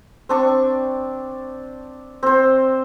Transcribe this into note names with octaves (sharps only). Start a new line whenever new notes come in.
C4 D4 C#6
C4 C5